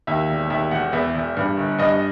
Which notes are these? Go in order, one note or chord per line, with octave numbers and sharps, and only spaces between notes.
D#2 E5
E1
D#2 E5
E1 F#5
E2 E5
E1
G2
G1
G2 D#5